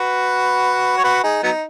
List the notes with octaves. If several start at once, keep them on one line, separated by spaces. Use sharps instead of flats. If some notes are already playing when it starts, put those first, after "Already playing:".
Already playing: F#4 B4
C#5
F#4 B4
D#4 G#4
F#3 B3 D#4